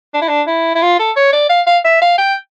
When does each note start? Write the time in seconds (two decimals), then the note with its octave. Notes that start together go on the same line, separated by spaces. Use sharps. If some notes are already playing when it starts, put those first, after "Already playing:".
0.14 D4
0.22 E4
0.29 D4
0.47 E4
0.75 E4
0.82 F4
0.99 A4
1.17 C#5
1.33 D5
1.50 F5
1.67 F5
1.85 E5
2.02 F5
2.18 G5